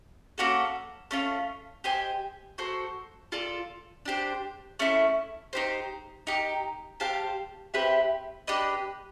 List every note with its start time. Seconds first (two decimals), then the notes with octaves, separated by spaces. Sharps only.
0.38 A#3 C#4 F#4 A4
1.11 A3 C#4 F4
1.84 G4 C5 D#5 G#5
2.58 F#4 A4 C5
3.32 F4 A4 D5
4.05 D4 G4 C5
4.79 A3 C#4 E4
5.53 D#4 G4 C5
6.27 D#4 G4 A#4
7.00 G4 C5 F5 A5
7.74 C4 E4 G4 B4
8.47 D4 G4 B4 D#5